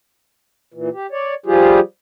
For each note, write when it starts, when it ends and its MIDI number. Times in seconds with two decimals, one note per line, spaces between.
0.74 0.89 46
0.74 0.89 52
0.94 1.07 67
1.11 1.34 73
1.11 1.34 74
1.46 1.80 53
1.46 1.80 55
1.46 1.80 65
1.46 1.80 67
1.46 1.80 68